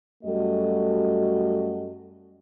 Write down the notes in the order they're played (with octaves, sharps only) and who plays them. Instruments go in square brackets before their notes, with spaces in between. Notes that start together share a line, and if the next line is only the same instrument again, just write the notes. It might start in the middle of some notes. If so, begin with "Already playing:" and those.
[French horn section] F#2 G3 A3 F#4 A4 D#5